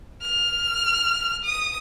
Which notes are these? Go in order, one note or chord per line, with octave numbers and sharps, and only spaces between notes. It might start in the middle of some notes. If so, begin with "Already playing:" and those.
F6
D#6